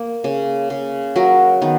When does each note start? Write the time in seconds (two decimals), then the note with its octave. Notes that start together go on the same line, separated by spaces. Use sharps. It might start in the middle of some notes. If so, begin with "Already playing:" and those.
Already playing: A#3
0.24 C#3
0.70 C#3
1.16 F#3 F#4 A#4
1.62 D#3 B3